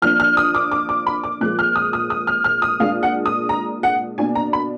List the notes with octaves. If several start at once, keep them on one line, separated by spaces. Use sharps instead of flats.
F3 A#3 D4 F6
F6
D#6
D6
D6
D6
B5
D6
A#2 F3 G#3 F#6
F6
D#6
D#6
D#6
F6
F6
D#6
A#2 G#3 D4 F5
F#5
D#6
A#5
F#5
B2 A#3 D4 G#5
A#5
B5